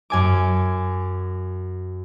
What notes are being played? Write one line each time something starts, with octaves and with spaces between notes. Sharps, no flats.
F#2 G#5 D6